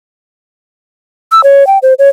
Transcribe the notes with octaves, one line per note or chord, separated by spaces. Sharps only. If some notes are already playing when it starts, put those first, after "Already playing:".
E6
C#5
G5
C5
C#5